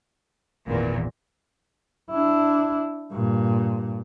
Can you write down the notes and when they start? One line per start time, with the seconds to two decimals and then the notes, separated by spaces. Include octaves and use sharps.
0.67 G#1 E2 A#2
2.11 D4 E4
3.13 G2 A#2